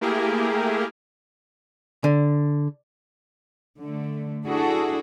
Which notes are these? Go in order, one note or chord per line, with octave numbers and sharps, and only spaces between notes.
A3 A#3 E4 G4 G#4 A#4
D3
D3 A3
D4 E4 F#4 G#4 A4